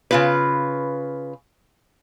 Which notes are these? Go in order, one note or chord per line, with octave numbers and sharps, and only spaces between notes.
C#3 F4 B4